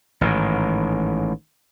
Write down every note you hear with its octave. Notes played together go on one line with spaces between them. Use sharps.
A1 G#2 D#3